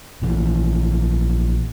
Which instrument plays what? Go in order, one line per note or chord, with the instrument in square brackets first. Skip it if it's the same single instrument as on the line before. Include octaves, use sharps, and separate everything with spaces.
[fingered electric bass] A#1 E3